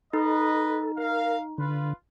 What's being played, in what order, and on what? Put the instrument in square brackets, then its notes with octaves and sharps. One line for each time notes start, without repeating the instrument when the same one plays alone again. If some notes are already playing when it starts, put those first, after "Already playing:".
[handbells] D#4 [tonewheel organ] A4 [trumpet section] B4 D#5
[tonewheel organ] A#4 [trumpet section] F5
[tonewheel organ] D3 [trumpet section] F4 B4